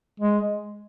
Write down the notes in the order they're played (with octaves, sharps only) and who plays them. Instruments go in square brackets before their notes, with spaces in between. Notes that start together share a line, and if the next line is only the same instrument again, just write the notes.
[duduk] G#3